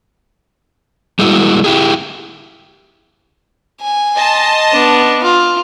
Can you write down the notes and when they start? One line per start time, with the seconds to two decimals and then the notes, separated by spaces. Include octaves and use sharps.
1.19 G3 G#3 A#3 E4 F#4
1.64 E4 G4 G#4
3.82 G#5
4.17 D#5 A5 C6
4.72 B3 D4
5.24 F4